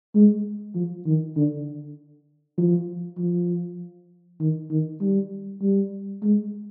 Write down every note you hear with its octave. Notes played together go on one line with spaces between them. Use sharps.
G#3
F3
D#3
D3
F3
F3
D#3
D#3
G3
G3
G#3